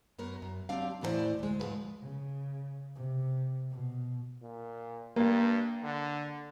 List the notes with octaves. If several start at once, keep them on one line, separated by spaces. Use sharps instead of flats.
F#2 B3 A#4 C#5
F#2
F#3 C4 D4 G4 F5
E2 A2 E3 A4 C5 D5
D2 G#3
G#2 F3 B4
C#3
C3
B2
A#2
G2 A#3
D3